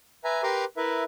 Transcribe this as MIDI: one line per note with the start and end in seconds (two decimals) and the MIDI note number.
0.24 0.43 71
0.24 0.43 76
0.24 0.43 80
0.24 0.43 82
0.43 0.65 67
0.43 0.65 70
0.43 0.65 71
0.43 0.65 82
0.43 0.65 84
0.43 0.65 86
0.77 1.04 64
0.77 1.04 70
0.77 1.04 71
0.77 1.04 76